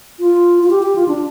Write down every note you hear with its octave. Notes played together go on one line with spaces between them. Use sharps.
F4
F4
G4
G4
F4
D4